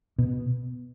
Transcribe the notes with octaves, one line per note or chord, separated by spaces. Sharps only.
B2